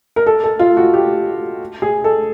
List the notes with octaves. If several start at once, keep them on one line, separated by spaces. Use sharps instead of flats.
A#4
A4
A4
F4
F#4
G4
G#4
A4